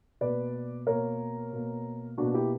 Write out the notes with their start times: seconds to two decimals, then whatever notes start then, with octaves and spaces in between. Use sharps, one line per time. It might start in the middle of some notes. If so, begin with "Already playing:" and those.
0.21 B2 A#3 B4 D5
0.87 B2 A#3 A#4 C#5
1.53 B2 A#3
2.18 B2 A#3 D4 F#4
2.34 E4 G4